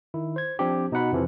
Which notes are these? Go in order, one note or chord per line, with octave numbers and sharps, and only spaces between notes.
D#3 E4
C5 G#6
F3 C4 D4 G4
B2 D#4 F#4 F#5 B5
F2 C3 E3 F3